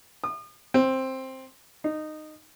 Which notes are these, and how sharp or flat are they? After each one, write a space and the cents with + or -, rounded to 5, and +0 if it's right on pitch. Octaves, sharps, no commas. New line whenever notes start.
D#6 -40
C4 +10
D#4 -15